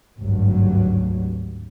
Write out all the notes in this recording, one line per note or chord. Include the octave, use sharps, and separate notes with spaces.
G#1 D2 G2 F#3